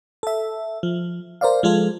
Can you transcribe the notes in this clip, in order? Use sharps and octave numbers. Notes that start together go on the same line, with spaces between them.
A4 E5
F3
A#4 C5 D5 F5
F3 G#3 F4 A4